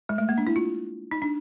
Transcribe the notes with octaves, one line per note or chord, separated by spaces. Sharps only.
G#3
A3
A#3
D4
E4
F4
D#4
D4